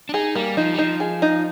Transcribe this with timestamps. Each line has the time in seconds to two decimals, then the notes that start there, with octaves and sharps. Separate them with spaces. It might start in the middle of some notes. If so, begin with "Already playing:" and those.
0.09 D4
0.14 D#4 G#4
0.35 G3 A#3
0.57 F3 D#4
0.74 G3
0.78 F3 D#4
1.00 G#4
1.22 D#4